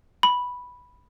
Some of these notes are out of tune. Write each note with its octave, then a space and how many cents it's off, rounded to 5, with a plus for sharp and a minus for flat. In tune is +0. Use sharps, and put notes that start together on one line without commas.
B5 -5